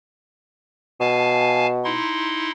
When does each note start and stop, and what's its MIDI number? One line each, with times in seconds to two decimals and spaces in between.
1.00 1.98 47
1.00 1.67 77
1.00 1.67 80
1.00 1.67 81
1.84 2.51 63
1.84 2.51 64
1.84 2.51 84